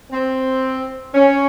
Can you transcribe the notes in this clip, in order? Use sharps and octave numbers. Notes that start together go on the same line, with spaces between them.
C4
C#4